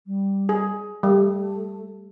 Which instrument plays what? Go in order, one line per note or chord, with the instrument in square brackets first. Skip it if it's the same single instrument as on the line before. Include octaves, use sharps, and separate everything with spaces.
[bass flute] G3
[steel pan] G#4
[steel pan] G3 [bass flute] A3